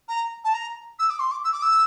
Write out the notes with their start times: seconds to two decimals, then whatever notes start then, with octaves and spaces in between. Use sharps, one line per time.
0.08 A#5
0.44 A5
0.54 A#5
0.99 E6
1.10 D6
1.20 C6
1.31 D6
1.44 E6
1.52 D6
1.62 E6